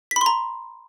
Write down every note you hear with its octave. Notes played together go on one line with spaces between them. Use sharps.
B6
B5
C6
A#5